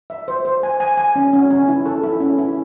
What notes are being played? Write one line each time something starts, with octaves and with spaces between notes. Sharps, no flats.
E5
C5
C5
G#5
G#5
G#5
C#4
C#4
C#4
E4
A4
E4
C#4
E4